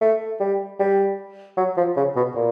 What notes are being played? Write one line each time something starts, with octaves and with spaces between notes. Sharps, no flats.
A3
G3
G3
F#3
F3
C#3
B2
A#2